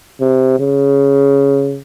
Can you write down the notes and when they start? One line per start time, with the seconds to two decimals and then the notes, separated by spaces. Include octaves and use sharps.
0.20 C3
0.60 C#3